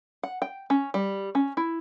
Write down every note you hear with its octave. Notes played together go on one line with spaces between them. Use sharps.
F#5
G5
C#4
G3
C#4
E4